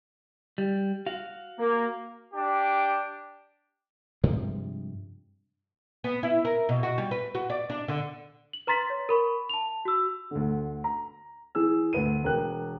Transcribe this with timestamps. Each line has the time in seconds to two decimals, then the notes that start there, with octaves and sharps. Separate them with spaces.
0.58 G3
1.06 F#4 F5
1.59 A#3
2.34 D4 G4
4.23 G2 C3 F3 G#3
6.04 B3
6.23 E4
6.45 A#4
6.69 B2
6.83 F#4
6.98 G3
7.11 B4
7.35 F#4
7.50 D5
7.70 D4
7.88 D3
8.53 F#7
8.67 B4 A#5 C6 A6 B6
8.90 C#5
9.09 A#4 B5 C#6
9.49 A5 F7
9.85 F#4 E6
10.31 D2 D3
10.84 A#5
11.55 E3 G#4 E6
11.93 D2 B4 D#7
12.23 E1 A#4 G5 F#6